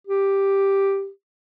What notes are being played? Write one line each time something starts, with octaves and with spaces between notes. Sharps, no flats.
G4